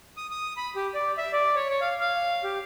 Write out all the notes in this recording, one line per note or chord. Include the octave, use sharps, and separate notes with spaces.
D#6
D#6
B5
G4
D5
E5
D5
C#5
C#5
F5
F5
G4